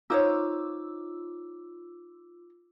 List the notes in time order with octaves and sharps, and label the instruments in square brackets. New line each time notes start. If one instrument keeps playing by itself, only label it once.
[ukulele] D#4 C5 C#5 [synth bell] F4 D6 E6